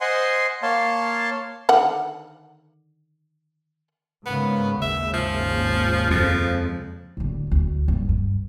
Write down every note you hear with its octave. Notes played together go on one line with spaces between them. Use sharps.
C5 D#5 F#5 G#5 C6
A#3 C#5 F5 A5 C6
D3 D#3 F#5
G#2 C#3 A#3 B3
G#1 D#2 C#3 E5
F3
F2 F3
D1 D3
D2
G2
G2